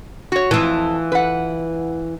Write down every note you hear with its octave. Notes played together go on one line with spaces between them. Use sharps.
F#4 C#5
F2 E3 F4 A5
B4 F#5